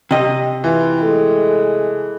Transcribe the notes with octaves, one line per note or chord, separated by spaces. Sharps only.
C3 D#5
E3 F4
G#3 A3